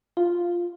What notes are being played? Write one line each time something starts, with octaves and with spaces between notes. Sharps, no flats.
F4